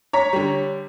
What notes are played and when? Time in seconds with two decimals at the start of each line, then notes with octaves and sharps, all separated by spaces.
0.13 C#5 A#5 B6
0.33 D3 G3